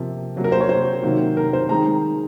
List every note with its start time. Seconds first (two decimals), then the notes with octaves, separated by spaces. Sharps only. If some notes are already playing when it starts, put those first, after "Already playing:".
Already playing: C3 F3 A#3
0.36 C3 F#3 A#3
0.44 A#4
0.52 C5
0.60 C#5
0.69 C5
1.03 C3 D#3 F#3 A#3
1.37 A#4
1.53 C5
1.69 D#3 G#3 C4 A#5